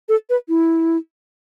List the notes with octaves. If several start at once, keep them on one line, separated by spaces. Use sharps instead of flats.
A4
B4
E4